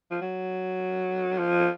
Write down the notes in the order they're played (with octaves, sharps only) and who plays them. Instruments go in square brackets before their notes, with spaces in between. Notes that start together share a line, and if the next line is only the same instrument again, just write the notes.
[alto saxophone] F3
F#3
F3